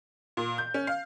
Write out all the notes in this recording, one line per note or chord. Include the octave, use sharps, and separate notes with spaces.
A#2
G6
C#4
F5